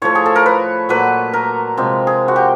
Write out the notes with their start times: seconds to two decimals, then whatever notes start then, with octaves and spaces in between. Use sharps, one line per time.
0.02 A2 F3 A3 C#5
0.15 G#4
0.26 A4
0.36 A#4
0.46 B4
0.89 A#2 F#3 A3 B4
1.33 A#4
1.77 C3 F3 G#3
2.07 G#4
2.28 F#4
2.36 G4